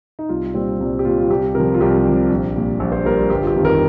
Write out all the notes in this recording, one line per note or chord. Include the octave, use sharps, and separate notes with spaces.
D#4
C2 F4
A#2 G3 C4
C2
G4
A#2 G3 F4
F4
C2 G4
C3 F3 A#4
F4
C2 G4
C3 F3
A#1
A#2 G3
A#1
C5
A#2 G3 A#4
G1 G4
F4
G4
F2 D#3 G3
A#4